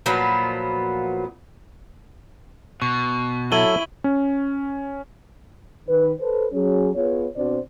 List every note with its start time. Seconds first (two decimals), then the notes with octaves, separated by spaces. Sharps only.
0.06 A#2 F3 F#3 B3
2.82 B2 C#6
3.52 F#3 E4 A4 C#5 D#7 F#7 G7
4.04 C#4
5.88 D#3 B4
6.21 A4 B4 C5
6.53 F#3 C#4 G#4
6.95 B3 F4 G#4 B4 C#5
7.36 B2 C4 D4 F#4 C5 D5